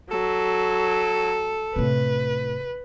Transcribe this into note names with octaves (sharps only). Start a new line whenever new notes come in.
F#3 A4
A2 C3 B4